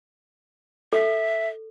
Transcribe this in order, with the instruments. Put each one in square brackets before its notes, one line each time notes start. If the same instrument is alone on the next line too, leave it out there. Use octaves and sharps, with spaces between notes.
[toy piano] A4 [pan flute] E5